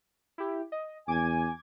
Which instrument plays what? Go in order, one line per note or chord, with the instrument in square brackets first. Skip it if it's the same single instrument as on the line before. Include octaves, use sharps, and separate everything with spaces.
[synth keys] E4 G4
D#5
[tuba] E2 [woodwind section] G#5 [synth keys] D6 G#6